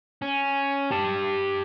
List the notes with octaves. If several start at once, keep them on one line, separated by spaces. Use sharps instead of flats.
C#4
G4 A5